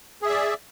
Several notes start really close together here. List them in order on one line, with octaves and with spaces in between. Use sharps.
G#4 E5 D5